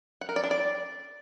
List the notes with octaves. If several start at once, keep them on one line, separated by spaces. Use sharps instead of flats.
F#5
A#4
D5
D4
D5